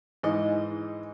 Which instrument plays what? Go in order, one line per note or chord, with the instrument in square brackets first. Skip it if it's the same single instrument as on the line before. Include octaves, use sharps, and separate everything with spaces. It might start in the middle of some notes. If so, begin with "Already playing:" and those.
[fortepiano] G#2 E3 D#5